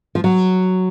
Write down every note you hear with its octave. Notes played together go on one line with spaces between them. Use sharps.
F3
F#3